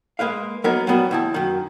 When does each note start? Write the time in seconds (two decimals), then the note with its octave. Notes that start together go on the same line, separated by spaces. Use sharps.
0.19 G#3 A#3 B4 F5
0.64 F#3 A#3 B3 D#4 A#4 C#5
0.87 F#3 G3 B3 E4 F#4
1.11 D#2 E4 A5
1.34 F#2 D#3